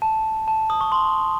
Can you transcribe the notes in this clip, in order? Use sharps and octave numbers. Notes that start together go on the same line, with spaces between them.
A5
A5
D#6
C#6
C6